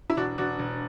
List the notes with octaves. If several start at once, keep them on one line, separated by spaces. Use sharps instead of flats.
E4
E1 D4 F#4
E1 D4 F#4
E1